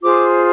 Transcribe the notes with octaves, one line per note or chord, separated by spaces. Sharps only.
F4 G#4 C5 D6